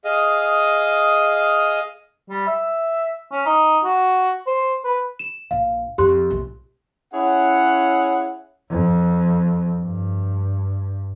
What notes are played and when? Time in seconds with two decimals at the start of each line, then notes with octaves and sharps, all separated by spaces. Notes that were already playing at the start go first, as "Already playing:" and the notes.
0.05 G#4 D#5 F5
2.30 G3
2.47 E5
3.32 C#4
3.46 D#4
3.84 F#4
4.47 C5
4.84 B4
5.19 E7
5.51 A#1 F5
5.98 F2 G4 C6 F#6
6.30 A#1
7.13 C#4 E4 G#4 C#5 F#5
8.70 F2
9.81 G2